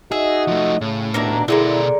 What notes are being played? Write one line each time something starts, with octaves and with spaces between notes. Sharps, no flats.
D#4 F#4 G#4 D#5 E5
F3 A3
A2 C#3
D#2 B2 A#3 D4 A#4 E5
B2 D3 G#3 E4 A#4 D5